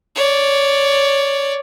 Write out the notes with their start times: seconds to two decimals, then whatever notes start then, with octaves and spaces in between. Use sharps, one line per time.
0.16 C#5 D5